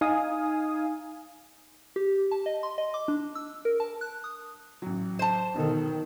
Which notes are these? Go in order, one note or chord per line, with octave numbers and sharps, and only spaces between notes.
D#4 F5 G#5 D#6
G4
A5
D#5
C6
D#5
D6
D4
E6
A#4
A5
F#6
D#6
A1 F#3
C5 A5
B1 B2 D#3 A4